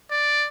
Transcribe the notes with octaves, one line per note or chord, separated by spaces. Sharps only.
D5